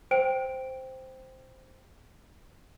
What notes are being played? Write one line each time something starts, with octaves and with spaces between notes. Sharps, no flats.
C5 G5 D7